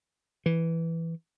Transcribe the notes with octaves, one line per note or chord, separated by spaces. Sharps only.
E3